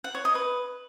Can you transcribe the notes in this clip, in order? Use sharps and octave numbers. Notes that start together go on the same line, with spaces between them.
F#5
C#5
D#5
B4